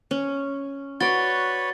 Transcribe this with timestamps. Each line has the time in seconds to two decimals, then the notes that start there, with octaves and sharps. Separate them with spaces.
0.11 C#4
1.00 F#4 B4 C#5 D5 A6 G7